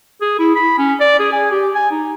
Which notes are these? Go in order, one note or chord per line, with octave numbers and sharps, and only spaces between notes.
G#4
E4
B5
C#4
D5
G#4
G#5
G4
G#5
D#4